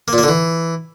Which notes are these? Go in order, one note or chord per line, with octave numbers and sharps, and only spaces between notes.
A#3
A#2
A#3
D3
E3